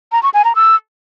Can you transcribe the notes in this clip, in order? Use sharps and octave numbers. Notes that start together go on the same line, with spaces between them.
A#5
C#6
G#5
A#5
E6